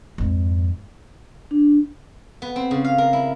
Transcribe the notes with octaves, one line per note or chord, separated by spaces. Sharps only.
F2 G#2
D4
B3
C4
C#3
F5
A#4
E4